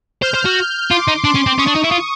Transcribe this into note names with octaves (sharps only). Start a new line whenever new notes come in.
C5 F6 G6
C5
F#4
F4 C6 D6
D#4
D4 C6 D6
C#4
C4
C#4 C#6 D#6
D4
D#4
E4
F4